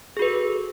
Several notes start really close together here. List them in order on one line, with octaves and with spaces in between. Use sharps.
G#4 F#4 B4 A4